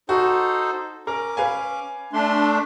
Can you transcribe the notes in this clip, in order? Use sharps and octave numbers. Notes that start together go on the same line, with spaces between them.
D#4 F#4 A4 C5
C#4 A#4 D6
B4 F5 G#5
A3 D4 C6